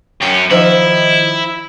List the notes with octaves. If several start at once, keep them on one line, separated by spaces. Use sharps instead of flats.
F#2 C#4 G5
D#3 F3 E4